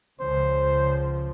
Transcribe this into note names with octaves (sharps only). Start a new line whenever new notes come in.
C#2 C#3 F3 C5